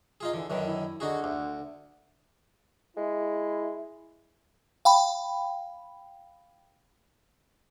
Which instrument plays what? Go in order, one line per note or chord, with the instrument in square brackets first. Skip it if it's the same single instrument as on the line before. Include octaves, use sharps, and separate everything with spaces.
[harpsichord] D#4 F4 G#4
[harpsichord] D3 [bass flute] E3
[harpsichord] F#2 D3 D#3 [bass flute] B4
[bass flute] E4
[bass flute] D3 [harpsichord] D#4 F#4 G#4
[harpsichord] D2
[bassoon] G#3 [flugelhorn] E4
[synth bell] F5 G5 B5